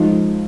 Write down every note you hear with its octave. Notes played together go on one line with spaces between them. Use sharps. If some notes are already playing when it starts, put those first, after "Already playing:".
Already playing: F3 G#3 D#4